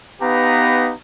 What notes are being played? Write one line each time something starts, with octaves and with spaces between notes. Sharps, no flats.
B3 D#4 G4 B4 F5 A#5